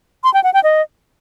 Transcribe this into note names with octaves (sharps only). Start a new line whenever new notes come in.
C6
G5
F#5
G5
D#5